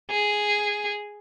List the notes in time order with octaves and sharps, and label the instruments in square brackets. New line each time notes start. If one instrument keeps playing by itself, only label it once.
[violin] G#4